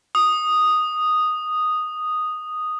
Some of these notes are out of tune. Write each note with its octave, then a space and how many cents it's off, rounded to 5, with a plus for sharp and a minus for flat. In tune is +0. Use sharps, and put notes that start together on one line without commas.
D#6 -5